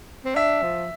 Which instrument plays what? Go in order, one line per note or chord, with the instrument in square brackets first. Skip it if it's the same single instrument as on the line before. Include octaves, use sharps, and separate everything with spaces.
[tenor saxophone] C4
[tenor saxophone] D4 [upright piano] E5
[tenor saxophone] F3